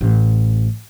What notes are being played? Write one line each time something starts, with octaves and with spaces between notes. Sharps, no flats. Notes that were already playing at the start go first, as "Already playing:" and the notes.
A1